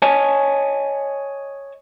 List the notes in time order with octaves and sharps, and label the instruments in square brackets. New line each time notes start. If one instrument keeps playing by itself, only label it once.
[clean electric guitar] C#5 D#5 G#5 A5